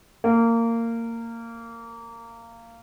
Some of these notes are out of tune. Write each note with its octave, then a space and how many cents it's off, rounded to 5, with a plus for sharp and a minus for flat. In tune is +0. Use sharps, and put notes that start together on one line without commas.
A#3 -20